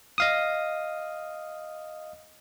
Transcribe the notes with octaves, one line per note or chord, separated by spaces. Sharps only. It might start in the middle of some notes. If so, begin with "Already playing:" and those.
D#5 F5 D#6